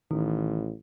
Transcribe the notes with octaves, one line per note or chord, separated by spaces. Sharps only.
A1 D#3